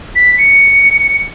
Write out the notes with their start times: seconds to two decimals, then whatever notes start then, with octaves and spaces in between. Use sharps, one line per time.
0.15 B6
0.38 C#7